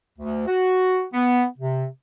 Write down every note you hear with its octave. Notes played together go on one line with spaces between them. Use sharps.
D2
F#4
B3
C3